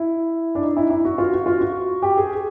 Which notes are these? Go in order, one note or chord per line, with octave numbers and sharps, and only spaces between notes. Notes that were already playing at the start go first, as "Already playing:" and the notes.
Already playing: E4
D4
D#4
E4
E4
F#4
F4
F#4
F4
F#4
G4
G#4